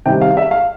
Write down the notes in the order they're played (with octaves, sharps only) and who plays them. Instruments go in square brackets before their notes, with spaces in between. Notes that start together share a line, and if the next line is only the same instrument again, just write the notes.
[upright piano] C3 D#3 G3 G5
F5
E5
F5